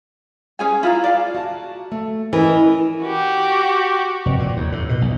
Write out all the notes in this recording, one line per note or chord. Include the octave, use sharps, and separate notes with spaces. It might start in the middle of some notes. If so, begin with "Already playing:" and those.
C#4 G#4 G#5
E4 F4 G#4 A#5
D5 F5
F#4 A5
A3
E3 C#4 A#4 D#5
F#4 G4
F1
A#2
D#2
A2
B2
B1